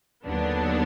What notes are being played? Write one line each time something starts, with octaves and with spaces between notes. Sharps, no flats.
D#2 D3 F#3 B3 D4